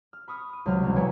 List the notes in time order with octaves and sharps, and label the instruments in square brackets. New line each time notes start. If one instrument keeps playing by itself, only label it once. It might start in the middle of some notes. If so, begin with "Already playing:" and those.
[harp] F6
B5 C#6 D#6 F6
D#7
C#2 C3 F#3 G#3 F6
E1 C2
B4 C#5 E5 G5 G#5 A#5